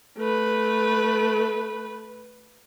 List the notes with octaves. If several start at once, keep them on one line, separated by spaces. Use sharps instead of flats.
A3 B4